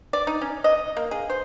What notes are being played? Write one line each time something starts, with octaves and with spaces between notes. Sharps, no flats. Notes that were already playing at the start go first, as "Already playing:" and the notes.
D5
D#4
C#4
D#5
A#3
G#4
C5